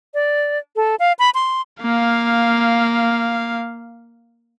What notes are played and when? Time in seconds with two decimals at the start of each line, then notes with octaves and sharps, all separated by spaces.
0.14 D5
0.76 A4
0.99 F5
1.19 B5
1.34 C6
1.82 A#3 F5